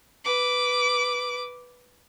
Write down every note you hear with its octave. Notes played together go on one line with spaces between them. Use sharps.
B4 D6